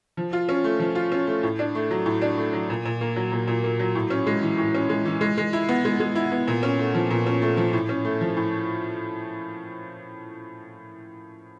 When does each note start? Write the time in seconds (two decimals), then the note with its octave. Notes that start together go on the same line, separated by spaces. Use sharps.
0.17 F3
0.33 F4
0.49 C#4
0.64 A3
0.80 F3
0.95 F4
1.12 C#4
1.27 A3
1.43 A2
1.59 D4
1.75 A3
1.91 F#3
2.06 A2
2.22 D4
2.37 A3
2.53 F#3
2.70 A#2
2.85 A#2
3.01 A#3
3.16 F#3
3.32 A#2
3.47 A#2
3.64 A#3
3.80 F#3
3.95 A2
4.10 C#4
4.27 G#3
4.43 E3
4.58 A2
4.75 C#4
4.89 G#3
5.05 E3
5.21 G#3
5.38 G#3
5.53 E4
5.69 B3
5.85 G#3
6.00 G#3
6.15 E4
6.32 B3
6.47 A#2
6.63 C#4
6.79 A3
6.95 F3
7.10 A#2
7.26 C#4
7.42 A3
7.57 F3
7.73 A2
7.89 C#4
8.04 A3
8.21 F3
8.37 A2